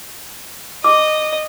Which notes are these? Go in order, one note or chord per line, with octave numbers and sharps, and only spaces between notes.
D#5 D6